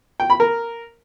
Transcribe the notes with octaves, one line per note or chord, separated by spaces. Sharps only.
G5
B5
A#4